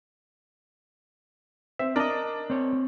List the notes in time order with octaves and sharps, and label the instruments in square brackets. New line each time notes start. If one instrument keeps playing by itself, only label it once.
[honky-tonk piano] C4 [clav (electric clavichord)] E5
[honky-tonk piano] D4 [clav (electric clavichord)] A#4 D#5
[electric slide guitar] C4 C#5